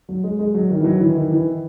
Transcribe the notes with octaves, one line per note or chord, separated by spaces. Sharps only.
F#3
G#3
G#3
F#3
D#3
E3
F#3
E3
D#3
E3